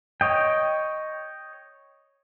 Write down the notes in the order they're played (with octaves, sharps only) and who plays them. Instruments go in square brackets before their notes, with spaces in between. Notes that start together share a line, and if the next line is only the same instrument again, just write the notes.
[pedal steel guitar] C#5 D#5 G5